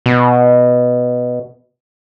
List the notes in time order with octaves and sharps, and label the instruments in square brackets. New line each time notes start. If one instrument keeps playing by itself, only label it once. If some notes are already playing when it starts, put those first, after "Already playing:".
[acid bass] B2